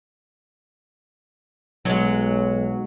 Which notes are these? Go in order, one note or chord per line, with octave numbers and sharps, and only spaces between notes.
B1 F#3 G#3